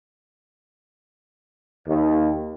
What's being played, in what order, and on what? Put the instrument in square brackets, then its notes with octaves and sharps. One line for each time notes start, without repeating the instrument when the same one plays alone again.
[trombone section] D#2